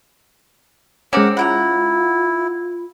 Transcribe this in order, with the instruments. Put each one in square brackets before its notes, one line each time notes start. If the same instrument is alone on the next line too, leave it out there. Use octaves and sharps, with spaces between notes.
[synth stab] G#3 C#4 [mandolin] C4 D6 [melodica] A#4 F#5
[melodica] E4 [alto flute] F4 [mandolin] F#5 G5 A#5